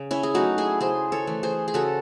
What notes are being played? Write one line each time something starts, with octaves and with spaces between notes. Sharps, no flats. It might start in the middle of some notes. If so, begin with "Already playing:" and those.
Already playing: C#3
C#4 E4
G#4
F#3 A3 D#4 F#4
E4 G#4
C#3 G#4 C5
A4 C#5
E3 A3
G#4 C5
G#4
C#3 F#4 A4